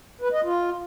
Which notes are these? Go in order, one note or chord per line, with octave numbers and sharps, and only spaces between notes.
B4
D#5
F4